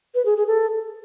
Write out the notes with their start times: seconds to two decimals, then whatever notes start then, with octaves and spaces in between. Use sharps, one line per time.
0.15 B4
0.26 G#4
0.36 G#4
0.47 A4